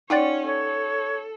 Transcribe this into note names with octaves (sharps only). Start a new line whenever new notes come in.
C#4 D#4 F4 G4 C#5 D5 F#5 A6
A4 C#5